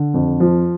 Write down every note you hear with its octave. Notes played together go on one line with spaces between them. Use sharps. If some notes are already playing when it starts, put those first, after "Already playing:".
Already playing: D3
F2
F3